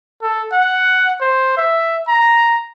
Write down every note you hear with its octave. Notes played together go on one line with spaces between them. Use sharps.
A4
F#5
C5
E5
A#5